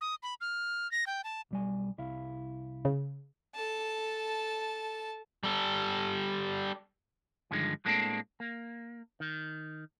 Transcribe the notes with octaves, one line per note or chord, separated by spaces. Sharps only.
D#6
B5
F6
A#6
G5
A5
B1 G3 G#5
C2 E4 F5
C#3
A4 A5
G3 A4
G2 D3 D#3 F3 G#3
A2 G#3 A#3 C4 D4 A4
A#3
D#3